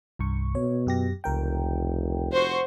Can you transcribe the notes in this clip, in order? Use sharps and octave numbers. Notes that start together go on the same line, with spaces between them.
C2 G2 C#6
B2 C#5
F#2 G4 A#6
F1 C#2 A#4 G5
F#4 C5 C#6